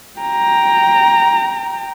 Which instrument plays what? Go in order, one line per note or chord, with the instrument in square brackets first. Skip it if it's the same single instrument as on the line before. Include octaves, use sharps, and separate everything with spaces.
[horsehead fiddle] G5 A#5